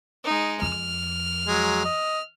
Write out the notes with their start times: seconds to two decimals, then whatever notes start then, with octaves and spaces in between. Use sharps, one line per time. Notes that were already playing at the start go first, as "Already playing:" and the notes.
0.25 G#3 D#4
0.62 F2 F6
1.47 F#3 G#3
1.85 D#5